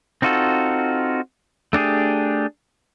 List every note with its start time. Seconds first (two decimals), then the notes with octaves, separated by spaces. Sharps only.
0.22 C4 D#4 F4 F#4 A4
1.73 A3 D4 G4 G#4